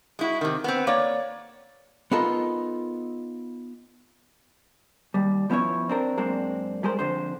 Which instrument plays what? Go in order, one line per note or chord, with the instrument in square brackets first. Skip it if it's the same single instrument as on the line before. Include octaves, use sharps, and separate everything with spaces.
[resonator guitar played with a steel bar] G#3 E4 F#4
C3 D#3
B3 C4
A#3 C#5 D5
[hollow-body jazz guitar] B3 D#4 F4 A4 A#4
D#2 G3
F3 B3 C#4 E4 C#5
C4 D4 A#4
F#2 G#3 A#3 C4 D4
G3 G#3 G#4 A#4 C5
F2 D3 C5